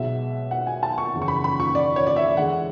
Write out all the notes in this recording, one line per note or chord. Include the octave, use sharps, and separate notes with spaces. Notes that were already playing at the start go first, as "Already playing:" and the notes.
Already playing: B1 B2 G#3 E5
F#5
G#5
A5
C#6
F#1 E2 C#3
C#6
B5
B5
C#6
D5
C#5
D5
E5
E2 D3 G#3 F#5